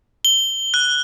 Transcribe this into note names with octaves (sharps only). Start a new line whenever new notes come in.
G7
F#6